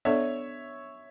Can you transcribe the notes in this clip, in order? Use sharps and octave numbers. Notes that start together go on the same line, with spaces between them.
B3 D4 A4 C#5 D5 E5